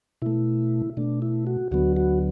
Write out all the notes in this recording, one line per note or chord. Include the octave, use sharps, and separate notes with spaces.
B2 A3 E4
B2 A3 D4
E4
F#4
D2 D3 F#3 B3 F#4
F#4